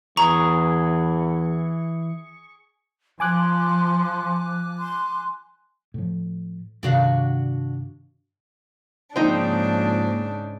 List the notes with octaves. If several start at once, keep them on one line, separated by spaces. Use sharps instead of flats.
E2 E3 G#4 A#5 C#6
F3 G#5 C6 D6 F#6
C6
A2 F3
G2 C3 D#3 D4 F#4 F5
G#2 C#3 F3 A#3 C4 D4 D#4